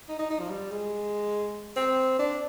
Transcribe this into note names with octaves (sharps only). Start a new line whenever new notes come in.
D#4
D#4
D#4
F3
G3
G#3
C4
D4